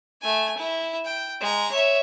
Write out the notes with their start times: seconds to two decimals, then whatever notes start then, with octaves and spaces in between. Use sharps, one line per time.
0.21 A3 G#5
0.58 E4
1.05 G5
1.41 G#3 A#5
1.71 C#5 E5